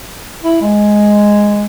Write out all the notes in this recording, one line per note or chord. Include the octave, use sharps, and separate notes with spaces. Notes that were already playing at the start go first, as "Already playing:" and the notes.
E4
G#3